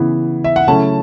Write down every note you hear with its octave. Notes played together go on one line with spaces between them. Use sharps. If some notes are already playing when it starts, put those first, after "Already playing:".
Already playing: C#3 E3 B3
E5
F#5
C#3 F#3 A3 C#4 E4 A5